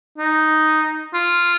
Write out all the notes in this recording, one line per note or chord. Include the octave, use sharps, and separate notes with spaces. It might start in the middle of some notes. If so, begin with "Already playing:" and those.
D#4
F4